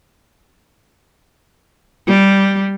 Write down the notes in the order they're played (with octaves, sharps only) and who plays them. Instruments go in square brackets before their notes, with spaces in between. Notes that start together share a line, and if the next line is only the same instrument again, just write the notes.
[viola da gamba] G3